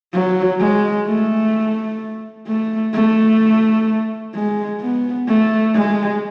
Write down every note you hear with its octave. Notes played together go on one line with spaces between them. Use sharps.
F#3
G#3
A3
A3
A3
G#3
B3
A3
G#3